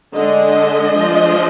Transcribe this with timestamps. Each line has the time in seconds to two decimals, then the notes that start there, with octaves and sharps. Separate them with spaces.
0.15 D3 G#3 D4 D#5
0.96 F3 G#3 D4